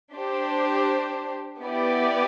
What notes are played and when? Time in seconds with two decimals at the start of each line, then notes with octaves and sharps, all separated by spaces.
0.13 D4 G4 C5
1.61 B3 E4 G4 B4 D5